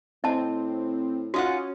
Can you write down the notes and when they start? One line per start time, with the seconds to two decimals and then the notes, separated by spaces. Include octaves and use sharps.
0.24 A2 C4 D#5 A5
1.34 C#4 D#4 F4 F#4 F#5